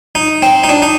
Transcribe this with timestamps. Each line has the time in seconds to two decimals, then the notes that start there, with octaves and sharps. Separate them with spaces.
0.15 D#4
0.42 C4
0.64 D#4
0.69 D4
0.82 D#4